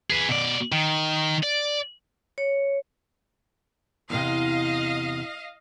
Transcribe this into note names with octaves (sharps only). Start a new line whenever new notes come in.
G#4 B4
B2 D5
D#3
D5
C#5
E2 A2 C3 D#5 F5